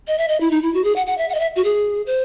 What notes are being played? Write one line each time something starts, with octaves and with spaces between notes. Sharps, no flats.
D#5
E5
D#5
E4
D#4
E4
F#4
G#4
F#5
F#5
E5
F#5
D#5
E5
F#4
G#4
C5